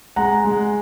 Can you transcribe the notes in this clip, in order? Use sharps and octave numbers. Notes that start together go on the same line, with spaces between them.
G#3 F#5 A#5
G#3